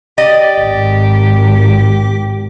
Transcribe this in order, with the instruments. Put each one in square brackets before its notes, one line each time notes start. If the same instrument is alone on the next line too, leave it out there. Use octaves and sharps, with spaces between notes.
[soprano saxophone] G4 [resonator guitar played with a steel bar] D5 D#5
[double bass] G#1